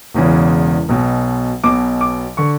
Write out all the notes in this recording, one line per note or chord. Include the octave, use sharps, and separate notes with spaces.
E1 E2 C#3 E3
B1 B2
B1 B2 D6
D6
D3 C#6